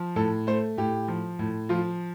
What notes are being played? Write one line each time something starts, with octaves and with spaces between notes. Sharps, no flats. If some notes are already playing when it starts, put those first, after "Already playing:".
Already playing: F3
A2 A4
A3 C5
A2 G4
F3
A2
F3 F4